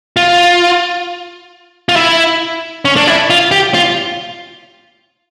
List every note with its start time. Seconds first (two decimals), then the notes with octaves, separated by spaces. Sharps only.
0.17 F4
1.89 F4
1.96 E4
2.85 C#4
2.96 D4
3.07 E4
3.30 F4
3.51 G4
3.74 F4